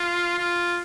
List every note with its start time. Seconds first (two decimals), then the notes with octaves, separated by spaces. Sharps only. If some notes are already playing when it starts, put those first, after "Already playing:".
Already playing: F4
0.39 F4